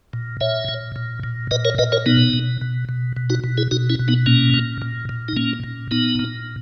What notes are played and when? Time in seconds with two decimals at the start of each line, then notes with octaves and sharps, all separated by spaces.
0.13 A#2
0.41 A#2 C#5 E5
0.69 A#2
0.96 A#2
1.23 A#2
1.51 A#2 B4 D#5
1.65 A#4 C#5
1.78 A#2 B4 D#5
1.92 A#4 C#5
2.06 B2 B3 D#4
2.33 B2
2.61 B2
2.89 B2
3.17 B2
3.30 D#4 F#4
3.44 B2
3.58 E4 G#4
3.71 B2 D#4 F#4
3.89 C#4 E4
3.99 B2
4.08 B3 D#4
4.26 A#2 A#3 C#4
4.54 A#2
4.82 A#2
5.09 A#2
5.28 D#4
5.37 A#2 A#3 C#4
5.64 A#2
5.91 A#2 B3 D#4
6.19 A#2